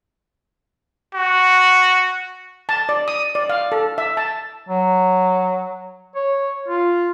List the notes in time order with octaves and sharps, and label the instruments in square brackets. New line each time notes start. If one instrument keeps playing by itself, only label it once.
[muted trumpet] F#4
[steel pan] A5
D5
D#6
D5
F5
A4
E5
A5
[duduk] F#3
C#5
F4